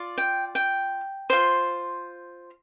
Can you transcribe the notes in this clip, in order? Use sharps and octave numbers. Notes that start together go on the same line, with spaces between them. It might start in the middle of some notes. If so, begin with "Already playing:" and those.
Already playing: F4 D5
G5
G5
F4 C5